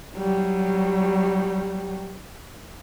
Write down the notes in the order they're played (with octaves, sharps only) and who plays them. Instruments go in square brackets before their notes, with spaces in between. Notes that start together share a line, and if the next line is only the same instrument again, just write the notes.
[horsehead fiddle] F#3 G3